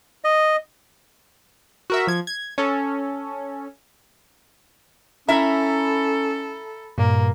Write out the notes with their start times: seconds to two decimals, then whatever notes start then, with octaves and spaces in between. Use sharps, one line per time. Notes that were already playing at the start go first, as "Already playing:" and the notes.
0.24 D#5
1.90 F#4 A#4 E5
2.07 F3 G#6
2.27 G#6
2.58 C#4 A4
5.28 C#4 E4 A4 A#4 E5 A#5 B5
6.98 G2 A#2 A#3